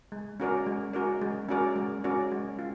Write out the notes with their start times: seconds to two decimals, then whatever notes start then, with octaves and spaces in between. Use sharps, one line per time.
0.12 G#3
0.40 C#4 F#4 A#4 D5
0.66 G#3
0.93 C#4 F#4 A#4 D5
1.22 G#3
1.49 C#4 F#4 A#4 D5
1.76 G#3
2.04 C#4 F#4 A#4 D5
2.32 G#3
2.59 F4